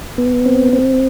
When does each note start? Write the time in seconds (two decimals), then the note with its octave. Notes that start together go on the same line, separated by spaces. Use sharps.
0.18 B3
0.46 C4
0.73 C4